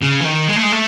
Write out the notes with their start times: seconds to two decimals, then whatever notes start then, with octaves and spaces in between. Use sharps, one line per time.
0.02 C#3
0.21 E3
0.25 D#3
0.49 G#3
0.56 A3
0.63 G#3
0.72 A3